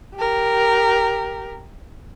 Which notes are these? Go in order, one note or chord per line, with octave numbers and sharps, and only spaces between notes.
G4 A#4